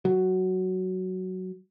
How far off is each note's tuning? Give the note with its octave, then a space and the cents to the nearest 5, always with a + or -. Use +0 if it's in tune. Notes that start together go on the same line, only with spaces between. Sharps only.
F#3 +5